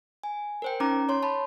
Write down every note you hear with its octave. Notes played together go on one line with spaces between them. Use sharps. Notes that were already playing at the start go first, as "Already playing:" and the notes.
G#5
A#4 C5 G5
C#4 D#4 A#5 D6
C#5 C6
A5 B5